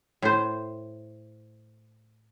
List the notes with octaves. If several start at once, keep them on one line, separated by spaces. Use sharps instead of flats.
A2 C5